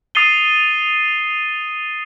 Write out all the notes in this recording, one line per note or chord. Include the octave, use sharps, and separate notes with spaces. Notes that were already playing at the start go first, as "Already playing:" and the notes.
D#6 A6 C7 D#7 G7